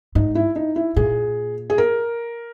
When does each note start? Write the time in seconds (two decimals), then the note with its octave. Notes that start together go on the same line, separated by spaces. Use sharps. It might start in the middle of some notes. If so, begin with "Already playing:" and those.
0.15 G#2 D#4
0.35 E4
0.56 D#4
0.76 E4
0.96 A#2 G#4
1.70 G#4
1.78 A#4